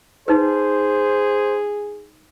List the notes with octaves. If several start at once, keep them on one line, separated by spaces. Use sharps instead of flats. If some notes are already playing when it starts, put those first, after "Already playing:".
D#4 G#4 B4 C5